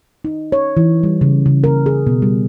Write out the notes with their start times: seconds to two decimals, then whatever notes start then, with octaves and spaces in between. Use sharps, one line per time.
0.25 D#4
0.52 C#5
0.77 E3
1.03 G3
1.21 C#3
1.46 C#3
1.64 A#4
1.86 G#4
2.07 B2
2.22 G3